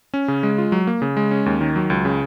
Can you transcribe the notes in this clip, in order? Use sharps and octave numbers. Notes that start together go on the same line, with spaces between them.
C#4
C#3
G#3
F4
F#3
A#3
C#3
G#3
C#4
D#2
D#3
F#3
C#2
C#3